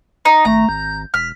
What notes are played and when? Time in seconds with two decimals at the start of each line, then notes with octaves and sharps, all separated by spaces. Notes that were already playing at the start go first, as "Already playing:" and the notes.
0.25 D#4
0.45 G#1 A3 A#5
0.69 G#1 G6
1.14 E1 F6 B6